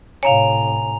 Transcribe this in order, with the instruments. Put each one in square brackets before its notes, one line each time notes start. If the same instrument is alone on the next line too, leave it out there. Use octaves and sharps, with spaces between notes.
[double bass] A2 C3 [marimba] C#5 F5 [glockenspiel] G#5 A#5 F7